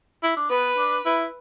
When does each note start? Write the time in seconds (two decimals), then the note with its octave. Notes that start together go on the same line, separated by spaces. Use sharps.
0.23 E4
0.37 D4
0.50 B3 B4
0.77 D4
1.06 E4